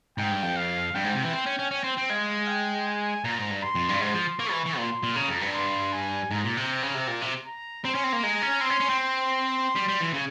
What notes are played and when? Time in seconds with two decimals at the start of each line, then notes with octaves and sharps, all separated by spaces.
0.18 G#2 G5
0.31 G2
0.43 F2
0.56 F5
0.95 G2 G5
1.04 G#2
1.14 C3
1.23 E3
1.33 C4
1.46 C#4
1.59 C#4
1.71 C#4 G5
1.84 C4
1.97 C4
2.09 G#3 F5
2.48 G5
2.87 G#5
3.24 A#2 A#5
3.38 G#2
3.51 G2
3.63 C6
3.75 F2
3.89 G2
4.01 G#2 C6
4.14 F3
4.39 A#3 C#6
4.52 E3
4.65 E3
4.77 A#2 C6
5.03 A#2
5.16 C#3 A#5
5.28 F2
5.41 G2
5.54 C6
5.93 G#5
6.31 G#2 A#5
6.44 A#2
6.57 C3
6.83 C#3
6.95 C3
7.07 A#2
7.21 C3
7.46 A#5
7.85 C4 C6
7.95 C#4
8.04 C4
8.13 A#3
8.23 G#3 A#5
8.42 C#4
8.61 C4 C6
8.70 C#4
8.80 C#4
8.90 C4
8.99 C6
9.76 G3
9.89 G3
10.01 E3
10.14 C#3